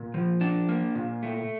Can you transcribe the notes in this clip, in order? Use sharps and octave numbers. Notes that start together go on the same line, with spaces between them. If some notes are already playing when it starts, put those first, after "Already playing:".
Already playing: A#2
F3
D4
A#3
A#2
A3